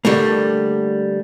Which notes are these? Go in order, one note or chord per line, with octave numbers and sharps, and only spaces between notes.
D3 G3 A3 A#3